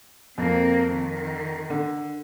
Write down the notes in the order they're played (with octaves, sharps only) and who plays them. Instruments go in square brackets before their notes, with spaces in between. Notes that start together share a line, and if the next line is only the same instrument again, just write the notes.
[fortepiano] F2 [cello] A#3 C4
[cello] D#3
[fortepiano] D3